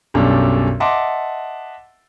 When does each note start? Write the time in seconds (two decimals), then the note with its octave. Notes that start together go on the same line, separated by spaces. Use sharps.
0.14 B1 F#2 G3 C#4 D4 A4
0.80 D#5 E5 F#5 A5 C6 D6